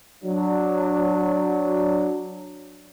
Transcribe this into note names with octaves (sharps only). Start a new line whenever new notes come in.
F#3 D4